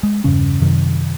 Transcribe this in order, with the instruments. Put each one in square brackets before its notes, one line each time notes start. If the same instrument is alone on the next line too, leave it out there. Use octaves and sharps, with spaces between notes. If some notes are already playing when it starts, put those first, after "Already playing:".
[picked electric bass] G#3
E2 G2 C#3 C#4
F#2 C3 D#3